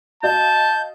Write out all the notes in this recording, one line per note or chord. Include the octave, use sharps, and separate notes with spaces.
F#4 D#5 F5 A5 G6